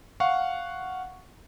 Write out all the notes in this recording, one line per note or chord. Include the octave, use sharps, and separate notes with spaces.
F5 F#5 C#6